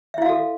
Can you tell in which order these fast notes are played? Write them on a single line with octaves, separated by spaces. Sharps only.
E5 E4 F5 F#4 A4